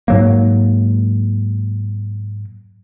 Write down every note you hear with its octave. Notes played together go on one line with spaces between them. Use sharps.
G#2 F#3 A#3